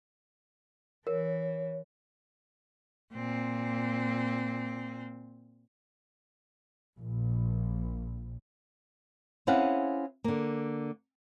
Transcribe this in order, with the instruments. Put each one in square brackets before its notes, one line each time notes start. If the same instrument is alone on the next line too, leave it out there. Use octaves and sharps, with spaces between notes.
[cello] E3 [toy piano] A#4 [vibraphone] C#5
[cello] A#2 C4
[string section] A#1
[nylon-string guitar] C4 C#4 E4 G#4 F5 F#5
D3 A#3